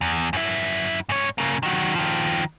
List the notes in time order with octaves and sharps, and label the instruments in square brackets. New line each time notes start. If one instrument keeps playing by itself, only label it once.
[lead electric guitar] E2
F#2 E4
G#2 C#5
C#3 A#3
D#3 F#3
D#3 F3